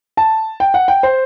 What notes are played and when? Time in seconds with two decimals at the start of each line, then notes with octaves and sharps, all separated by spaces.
0.17 A5
0.60 G5
0.74 F#5
0.88 G5
1.03 C5